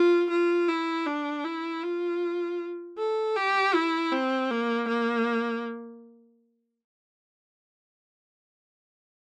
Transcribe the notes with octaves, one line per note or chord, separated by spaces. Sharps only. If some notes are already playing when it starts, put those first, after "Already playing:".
Already playing: F4
F4
E4
D4
E4
F4
A4
G4
E4
C4
A#3
A#3